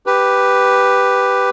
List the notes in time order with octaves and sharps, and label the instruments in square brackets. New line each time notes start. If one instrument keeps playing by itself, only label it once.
[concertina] G4 B4